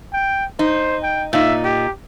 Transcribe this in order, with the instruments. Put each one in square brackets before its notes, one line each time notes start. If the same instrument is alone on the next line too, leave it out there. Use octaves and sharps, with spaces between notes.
[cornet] G5
[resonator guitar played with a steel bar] D#4 [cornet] C5
[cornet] G5
[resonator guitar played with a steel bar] A#2 D#4 [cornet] E5
[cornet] G4